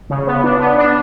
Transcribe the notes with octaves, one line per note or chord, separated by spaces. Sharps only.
C#3
B3
D4
B3
D4